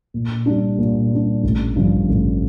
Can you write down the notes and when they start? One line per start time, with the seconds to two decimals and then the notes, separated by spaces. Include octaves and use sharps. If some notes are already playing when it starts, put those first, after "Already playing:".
0.14 A#2
0.46 G3 D4
0.78 A#2
1.12 G3 D4
1.43 A1
1.75 G2 D3 F3
2.09 A1